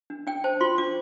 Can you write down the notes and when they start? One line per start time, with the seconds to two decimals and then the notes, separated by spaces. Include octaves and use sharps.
0.10 D4
0.27 D4 G5
0.44 C5 A5
0.61 F4 C6
0.78 D4 D6